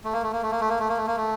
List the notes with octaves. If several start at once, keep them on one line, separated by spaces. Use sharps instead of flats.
A3
A#3
A3
A#3
A3
A#3
A3
A#3
A3
A#3
A3
A#3
A3